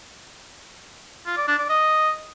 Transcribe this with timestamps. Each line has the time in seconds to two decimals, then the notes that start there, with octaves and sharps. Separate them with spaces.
1.26 F4
1.37 D5
1.48 D4
1.59 D5
1.69 D#5